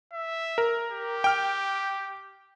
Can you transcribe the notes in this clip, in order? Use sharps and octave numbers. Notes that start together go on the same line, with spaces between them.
E5
A#4
G4
G5 F6